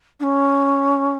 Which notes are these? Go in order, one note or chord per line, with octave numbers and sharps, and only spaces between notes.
D4
C#4